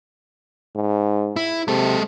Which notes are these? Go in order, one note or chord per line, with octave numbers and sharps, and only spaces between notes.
G#2
E4
C3 G#3 A4